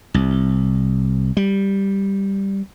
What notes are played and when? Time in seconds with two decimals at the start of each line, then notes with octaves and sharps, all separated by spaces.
0.14 C2
1.37 G3